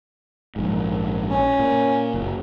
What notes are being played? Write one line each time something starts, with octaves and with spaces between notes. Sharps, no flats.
A#1 G#2
C#4
A#2
F#1